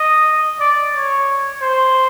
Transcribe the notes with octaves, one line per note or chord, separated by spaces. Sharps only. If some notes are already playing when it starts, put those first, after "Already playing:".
Already playing: D#5
D5
C#5
C5